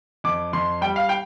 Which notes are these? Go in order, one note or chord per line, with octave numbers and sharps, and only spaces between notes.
F2 D6
F2 C6
G3 G5
F5
G5